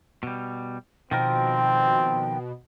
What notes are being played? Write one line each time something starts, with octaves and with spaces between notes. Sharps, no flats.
B2 G3
B2 D#3 F3 C4 A#4 G5